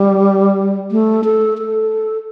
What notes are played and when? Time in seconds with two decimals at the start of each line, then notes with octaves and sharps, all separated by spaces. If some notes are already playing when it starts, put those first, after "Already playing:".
Already playing: G3
0.91 A3
1.24 A4
1.58 A4